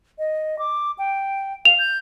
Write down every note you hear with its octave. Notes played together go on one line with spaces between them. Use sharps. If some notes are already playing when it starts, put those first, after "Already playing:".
D#5
D6
G5
F5 F7
G6